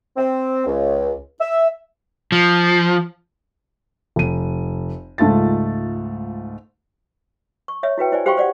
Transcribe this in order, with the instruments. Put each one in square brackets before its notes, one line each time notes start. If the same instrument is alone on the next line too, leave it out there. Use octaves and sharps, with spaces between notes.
[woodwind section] C4
C#2
E5
[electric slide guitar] F3
[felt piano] F1 D#7
C#2 G#2 A3 F4 A6
[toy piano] C#6
C#5 E5
E4 F#4 B4 G5
E4 C5 D5 G#5
G4 C5 F5 G5 C6 C#6
C5 D5 F#5